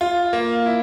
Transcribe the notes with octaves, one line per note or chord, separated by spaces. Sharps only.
F4
A#3
E4